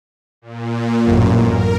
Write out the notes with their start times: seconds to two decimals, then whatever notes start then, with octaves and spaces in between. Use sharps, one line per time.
0.42 A#2
1.05 A1 F#2
1.44 A#4